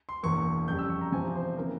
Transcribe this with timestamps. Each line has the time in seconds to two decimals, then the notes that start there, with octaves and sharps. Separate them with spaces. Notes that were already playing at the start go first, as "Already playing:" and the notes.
0.09 C6
0.23 E1 E2 E3 A#3 C#6
0.68 F2 C#3 G3 G6
0.79 E6
0.90 C#6
1.01 A#5
1.12 E1 E2 C3 F3 G#5
1.35 C5
1.57 C#3 E3 A#3 C#4 A#4